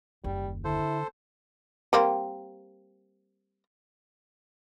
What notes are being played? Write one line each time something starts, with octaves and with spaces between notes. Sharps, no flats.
F#1 D#2 G3
D3 E4 A4 C5
G3 A#3 C4